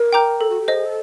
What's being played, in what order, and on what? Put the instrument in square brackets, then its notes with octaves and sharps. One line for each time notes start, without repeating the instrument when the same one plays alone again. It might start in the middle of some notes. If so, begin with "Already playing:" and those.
Already playing: [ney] A#4
[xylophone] G5 A#5 D6 G6
A4
[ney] F#4
G4
[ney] G#4 [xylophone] C5 D#5
[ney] A4